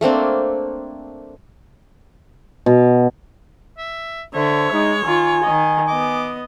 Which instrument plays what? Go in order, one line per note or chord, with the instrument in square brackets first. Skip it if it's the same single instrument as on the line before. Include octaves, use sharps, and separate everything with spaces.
[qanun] A3 A#3 C4 D4
[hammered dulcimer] B2
[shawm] E5
[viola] D3 E5 [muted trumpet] C5 [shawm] C#5
[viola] G#3 [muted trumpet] D#4
[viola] D#3 F4 [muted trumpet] G#5
[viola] D#3 D#5
[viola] B3 D#5 [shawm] D6